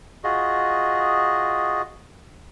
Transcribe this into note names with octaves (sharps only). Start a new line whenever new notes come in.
F4 F#4 G#4 D#5